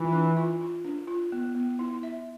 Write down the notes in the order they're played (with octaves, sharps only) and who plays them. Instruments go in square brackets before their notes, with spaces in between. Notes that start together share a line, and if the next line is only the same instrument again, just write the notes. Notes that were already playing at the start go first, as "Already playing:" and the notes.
Already playing: [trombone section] E3 [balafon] F4
[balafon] D4
F4
F4
D4
F4
B3
B3
E4
E5